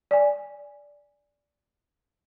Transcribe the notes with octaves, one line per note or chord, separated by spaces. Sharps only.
D5 G#5